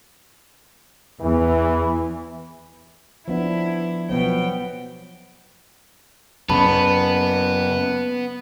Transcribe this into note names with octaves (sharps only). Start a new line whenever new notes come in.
E2 E3
F3 B3 D4 E4
B2 F3 F#3 B3 G5
F#2 C#3 B3 A5 B5